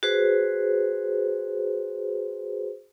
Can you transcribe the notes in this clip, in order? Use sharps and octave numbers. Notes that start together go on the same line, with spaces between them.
F#4 G#4 B4 C5